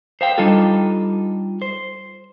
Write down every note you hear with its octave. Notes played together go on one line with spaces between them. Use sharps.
C5 F5 G5
G3 D4 D#4 F4 A4
C5